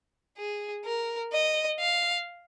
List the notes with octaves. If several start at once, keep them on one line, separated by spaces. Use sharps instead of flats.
G#4
A#4
D#5
F5